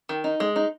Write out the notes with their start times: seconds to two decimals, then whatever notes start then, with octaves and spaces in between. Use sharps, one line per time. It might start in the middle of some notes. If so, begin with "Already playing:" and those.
0.09 D#3
0.24 D#4
0.40 G#3
0.56 D#4